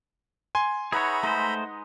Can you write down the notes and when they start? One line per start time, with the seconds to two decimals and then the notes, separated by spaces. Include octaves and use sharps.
0.55 G#5 C6
0.92 D#4 G#4 B4 C#5 E5 F#5 A#5 B5
1.23 G#3 A3 D#4 C5 D#5